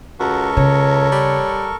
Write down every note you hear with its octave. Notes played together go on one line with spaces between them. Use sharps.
C#2 F#4 A4 A#4 C#6
C#3 C#5
G3